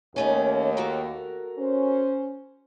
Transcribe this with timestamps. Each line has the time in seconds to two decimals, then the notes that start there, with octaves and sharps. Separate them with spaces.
0.16 D#2 D#3 A3 C#4
0.77 F#4 A4 A#4
1.59 C#4 C5